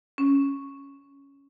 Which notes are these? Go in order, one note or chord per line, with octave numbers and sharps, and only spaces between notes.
C#4